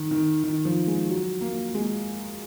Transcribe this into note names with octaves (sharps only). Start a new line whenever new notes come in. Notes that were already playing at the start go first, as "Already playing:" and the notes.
Already playing: D#3
D#3
D#3
F3
G#3
F#3
A#3
G#3